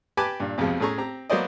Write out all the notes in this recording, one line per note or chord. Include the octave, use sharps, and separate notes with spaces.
G4 B4 G#5 A5 B5 D6
G2 A#2
B1 F2 C3 F3 G#3
A2 A3 C#4 G#4 A#5 C#6
C4 G4 A#5
F#3 A#3 B3 C5 D5 D#5